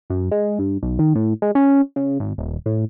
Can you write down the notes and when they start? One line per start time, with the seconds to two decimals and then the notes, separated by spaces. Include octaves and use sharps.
0.10 F#2
0.31 G#3
0.59 G2
0.83 B1
0.99 D#3
1.15 A2
1.42 G#3
1.55 C#4
1.96 C#3
2.20 G#1
2.38 D#1
2.66 A2